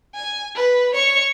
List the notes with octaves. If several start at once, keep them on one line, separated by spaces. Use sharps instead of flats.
G#5
B4
C#5 C#6